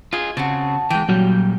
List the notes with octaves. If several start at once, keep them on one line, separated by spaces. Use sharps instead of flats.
F4 G#4 D#5
C#3 C4 F#4 A5
E3 G#3 G5
A#2 F#3 G3